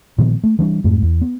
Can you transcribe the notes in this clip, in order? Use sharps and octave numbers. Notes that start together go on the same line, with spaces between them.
A#2 D#3 F3 B3
A3
E3 G3 D4
F2 G#2 A3
E2
B3